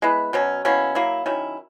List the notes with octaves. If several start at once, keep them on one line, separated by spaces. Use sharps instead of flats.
G#3 B3 E4 B4
B2 F#3 C#4
B2 A#3 C#4 E4
F#3 A#3 E4
D#3 F#3 C#4 E4